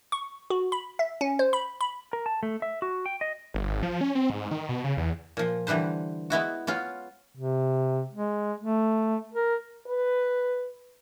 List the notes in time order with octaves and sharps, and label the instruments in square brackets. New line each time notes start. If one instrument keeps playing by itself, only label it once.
[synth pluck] C#6
F#4
B5
E5
C#4
C5
B5
B5
[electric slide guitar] A#4
A5
A3
E5
F#4
G5
D#5
[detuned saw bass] G1
G#1
F3
C#4
C4
G#2
D#3
B2
C#3
E2
[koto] A#2 F3
D3 E3 G3 B4 C5
G#3 B3 E4 F#4
B3 C#4 F4
[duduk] C3
G#3
A3
A#4
[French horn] B4